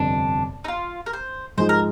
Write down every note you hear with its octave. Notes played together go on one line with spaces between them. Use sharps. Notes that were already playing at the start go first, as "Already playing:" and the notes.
Already playing: G1 F2 C3 D4
D#4
F4
A#4
C5
G#2 F3 G#3 D#4 C5
A#4